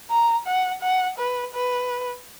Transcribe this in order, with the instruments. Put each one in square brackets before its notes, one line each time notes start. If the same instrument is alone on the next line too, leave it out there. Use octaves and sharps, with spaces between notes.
[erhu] A#5
F#5
F#5
B4
B4